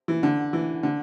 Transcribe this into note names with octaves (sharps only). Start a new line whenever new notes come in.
E3
D3
E3
D3